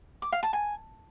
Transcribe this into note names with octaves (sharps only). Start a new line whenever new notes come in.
D6
F5
A5
G#5